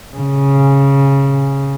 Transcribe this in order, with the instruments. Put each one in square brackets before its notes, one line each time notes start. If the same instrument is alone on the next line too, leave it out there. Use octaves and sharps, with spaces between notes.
[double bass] C#3